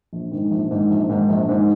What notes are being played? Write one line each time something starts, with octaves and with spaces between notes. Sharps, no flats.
A#1
G#2 D#3
A#1
G#2 D#3
A#1
G#2 D#3
A#1
G#2 D#3